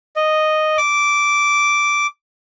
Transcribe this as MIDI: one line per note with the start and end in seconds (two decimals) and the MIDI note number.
0.16 0.77 75
0.78 2.07 86